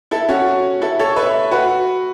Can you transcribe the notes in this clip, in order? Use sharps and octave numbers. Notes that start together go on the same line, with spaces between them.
E4 A4
C#4 F#4
E4 A4
A4 C#5
B4 E5
F#4 B4